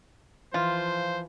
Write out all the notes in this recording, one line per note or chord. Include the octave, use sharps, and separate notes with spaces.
E3 F3 F4 C5